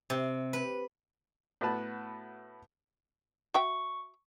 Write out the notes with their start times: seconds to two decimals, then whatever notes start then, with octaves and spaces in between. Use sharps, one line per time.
0.10 C3
0.53 B4
1.61 A2 B3 F#4 B4 A5
3.54 F#4 E5 G5 C#6